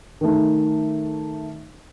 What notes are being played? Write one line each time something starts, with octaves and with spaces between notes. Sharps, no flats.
D#3 A3 D#4